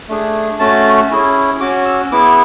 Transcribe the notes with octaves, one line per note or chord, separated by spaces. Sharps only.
A3 D4 G#4
A3 C#4 F#4 A5
C#4 E4 G#4
C#4 F#4 D6
E6
B3 E4 G#4 D6